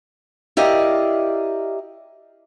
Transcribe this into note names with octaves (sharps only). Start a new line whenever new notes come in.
E4 G4 A#4 D5 D#5 F5